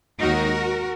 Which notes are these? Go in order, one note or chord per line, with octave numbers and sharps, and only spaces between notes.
D#2 D#3 G#3 D#4 F#4 A#4